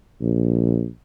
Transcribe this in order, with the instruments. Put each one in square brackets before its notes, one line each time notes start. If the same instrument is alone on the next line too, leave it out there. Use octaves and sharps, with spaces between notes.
[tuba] A#1